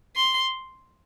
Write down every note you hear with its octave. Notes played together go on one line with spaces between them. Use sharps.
C6